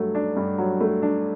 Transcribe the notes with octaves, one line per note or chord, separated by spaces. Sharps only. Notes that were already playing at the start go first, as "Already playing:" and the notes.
Already playing: G2 F#3 A3
D4
G2
F#3
A3
D4